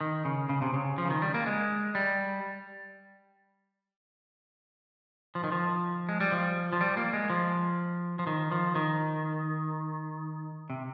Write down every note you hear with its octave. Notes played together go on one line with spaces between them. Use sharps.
D#3
C#3
C#3
C3
C#3
F3
C#3
D#3
G3
A#3
G#3
G3
F3
D#3
F3
G#3
G3
F3
F3
G3
A#3
G#3
F3
F3
D#3
F3
D#3
C3